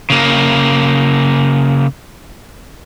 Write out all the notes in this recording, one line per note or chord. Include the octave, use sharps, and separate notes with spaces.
C#3 A#3